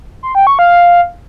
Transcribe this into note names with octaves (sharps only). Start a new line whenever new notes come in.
C6
G5
C#6
F5